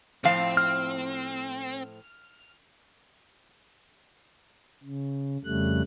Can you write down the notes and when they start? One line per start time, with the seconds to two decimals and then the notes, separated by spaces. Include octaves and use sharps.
0.24 A2 F3 C4 F5
0.57 F6
4.83 C#3
5.44 F2 C#3 G3 A3 F#6